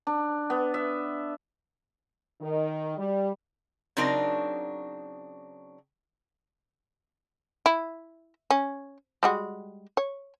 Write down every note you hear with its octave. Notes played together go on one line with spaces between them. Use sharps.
D4
B3
E5
D#3
G3
C#3 F#3 C4 D4 D#4 A#4
E4
C#4
G3 G#3 F#4
C#5